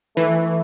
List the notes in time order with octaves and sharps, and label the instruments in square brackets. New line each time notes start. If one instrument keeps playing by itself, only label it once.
[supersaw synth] E3 [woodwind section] A3